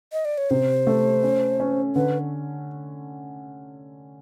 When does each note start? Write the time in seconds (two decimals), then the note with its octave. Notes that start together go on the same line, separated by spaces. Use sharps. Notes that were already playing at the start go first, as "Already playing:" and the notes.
0.13 D#5
0.25 D5
0.38 C#5
0.50 C3 C5
0.87 A3
1.23 C#4
1.60 C#4
1.96 D3 B4